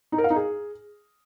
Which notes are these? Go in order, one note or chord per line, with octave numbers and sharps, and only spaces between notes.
D#4
A#4
F5
D#4
G#4